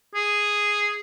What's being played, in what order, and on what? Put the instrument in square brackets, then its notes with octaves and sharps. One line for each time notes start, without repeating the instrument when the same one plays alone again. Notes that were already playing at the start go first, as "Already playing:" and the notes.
[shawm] G#4